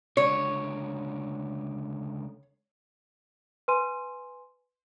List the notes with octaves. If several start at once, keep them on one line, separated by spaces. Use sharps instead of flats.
C#2 D3 C#5
B4 G#5 C6 D#7